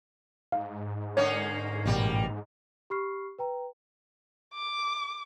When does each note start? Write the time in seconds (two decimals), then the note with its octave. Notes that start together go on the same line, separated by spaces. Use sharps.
0.52 G#2 F5
1.17 D3 A#3 C#4 C#5
1.86 A1 B2 G3 A#3
2.90 G4 B5 C#6 F6 C7
3.39 B4 G5 A#5
4.54 D6